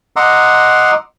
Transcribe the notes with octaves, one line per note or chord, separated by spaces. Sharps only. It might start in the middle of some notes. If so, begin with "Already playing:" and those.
D#5 F#5 A#5 C6 D6 E6